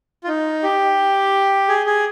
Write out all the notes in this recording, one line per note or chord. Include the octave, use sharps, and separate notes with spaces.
F4
D#4
G4
G#4
G#4